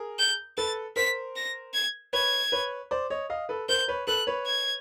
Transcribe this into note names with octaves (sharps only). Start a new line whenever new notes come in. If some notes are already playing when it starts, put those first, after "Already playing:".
Already playing: G#4 A#4
G6
A4 B4 A6
A#4 C5 B6
A#6
G#6
B4 C#5 G#6
B4 C#5
C5 D5
C#5 D#5
D#5 F5
A4 B4
A#4 C5 G6
B4 C#5
A4 B4 F#6
B4 C#5
G#6